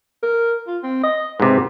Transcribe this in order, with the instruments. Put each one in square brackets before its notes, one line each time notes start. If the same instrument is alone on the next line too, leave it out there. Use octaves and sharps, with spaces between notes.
[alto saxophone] A#4
F4
C4
D#5
[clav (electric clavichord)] G#2 C3 [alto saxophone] B4